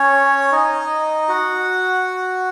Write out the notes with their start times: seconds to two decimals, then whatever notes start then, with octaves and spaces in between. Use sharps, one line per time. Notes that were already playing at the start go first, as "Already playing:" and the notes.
Already playing: C#4 C#5
0.52 D#4 D#5
1.28 F#4 F#5